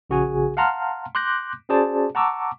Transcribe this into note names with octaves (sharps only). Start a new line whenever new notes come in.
A#1 C#3 F#4 G#4 G#5
F5 F#5 A5 A#5 C6 F6
C6 D6 F#6 G6 A#6
C#4 F#4 G#4 C5 D5 A5
F#5 A5 A#5 C#6 D6 E6